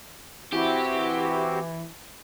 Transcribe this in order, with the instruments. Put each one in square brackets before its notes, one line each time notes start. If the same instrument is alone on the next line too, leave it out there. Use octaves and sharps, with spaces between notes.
[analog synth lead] E3 [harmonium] C4 E4 F#4 [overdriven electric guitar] G4